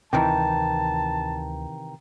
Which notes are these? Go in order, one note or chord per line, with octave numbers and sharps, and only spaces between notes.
D2 C3 D#3 E3 G5 A5 A#5